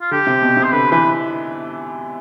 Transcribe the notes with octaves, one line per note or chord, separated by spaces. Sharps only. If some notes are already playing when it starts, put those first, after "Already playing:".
F4
D3 G4
C3
B2
C3
C5
D3 B4
E3 B4